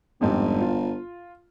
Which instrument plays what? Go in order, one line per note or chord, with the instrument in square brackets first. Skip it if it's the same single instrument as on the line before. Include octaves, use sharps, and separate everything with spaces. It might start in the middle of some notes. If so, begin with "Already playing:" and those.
[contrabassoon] G1 [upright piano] F2 G#2 G3
[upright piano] F4